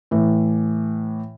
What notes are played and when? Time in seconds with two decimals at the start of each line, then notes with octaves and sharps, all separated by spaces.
0.11 A2 E3